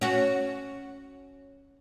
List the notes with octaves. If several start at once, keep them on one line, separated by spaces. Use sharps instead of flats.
C#4 F#4